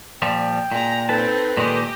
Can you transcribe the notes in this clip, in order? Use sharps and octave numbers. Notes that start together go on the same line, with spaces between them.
A#2 F3 G3 G5
A#2 G#3 A#5
C4 D#4 A4 B4 A5
A#2 D#3 G#3 G4 D#5